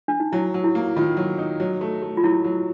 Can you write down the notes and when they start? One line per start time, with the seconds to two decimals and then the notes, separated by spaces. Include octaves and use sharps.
0.08 D4
0.20 D#4
0.32 F#3 E4
0.54 F#3
0.64 E4
0.75 A#3
0.96 D#3 F4
1.17 F#3
1.38 D#4
1.60 F#3
1.81 A3
2.02 A3
2.17 F4
2.23 F#3 E4
2.44 F#3